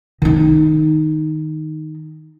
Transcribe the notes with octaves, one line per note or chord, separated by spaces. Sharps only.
D#3 D#4